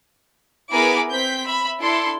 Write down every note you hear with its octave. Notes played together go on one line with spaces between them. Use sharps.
B3 E4 G#4 A#4 B5 D6
C4 G6 B6
E5 B5
D4 E4 A4 C6